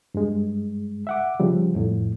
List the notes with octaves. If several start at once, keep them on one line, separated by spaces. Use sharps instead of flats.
G2 G#3
E5 F#5 D6
C#3 F3 G3
F2 A2